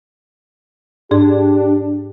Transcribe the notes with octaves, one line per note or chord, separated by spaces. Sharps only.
G#2 D4 G4 G#4